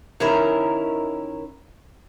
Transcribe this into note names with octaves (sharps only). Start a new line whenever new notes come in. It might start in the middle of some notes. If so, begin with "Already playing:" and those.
D#3 C#4 E4 A#4